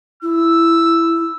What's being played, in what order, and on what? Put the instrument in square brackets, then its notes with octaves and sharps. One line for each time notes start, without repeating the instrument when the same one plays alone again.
[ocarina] E4 [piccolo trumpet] E6